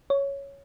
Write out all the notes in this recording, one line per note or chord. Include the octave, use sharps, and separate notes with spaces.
C#5